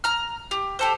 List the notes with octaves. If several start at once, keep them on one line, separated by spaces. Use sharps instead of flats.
A#5 F6
G4
G4 A4 C5